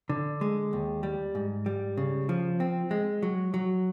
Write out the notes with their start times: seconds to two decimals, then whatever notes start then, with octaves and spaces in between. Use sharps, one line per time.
0.09 D3
0.41 G#3
0.73 D#2
1.03 G3
1.35 G#2
1.66 G3
1.97 C#3
2.29 F3
2.60 C4
2.91 G#3
3.23 F#3
3.54 F#3